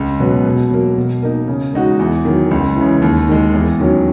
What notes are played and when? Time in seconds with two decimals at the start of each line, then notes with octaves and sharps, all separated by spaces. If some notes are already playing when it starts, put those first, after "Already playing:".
Already playing: C#2
0.20 B2 F#3 B3
0.45 B2
0.71 F#3 A#3
0.97 B2
1.23 A#3 D#4
1.48 C#3
1.74 G#3 D#4 F#4
1.99 E2
2.25 D#3 F#3
2.51 C#2
2.76 C#3 E3
3.02 D#2
3.28 D#3 G#3
3.54 E2
3.80 D#3 F#3 C#4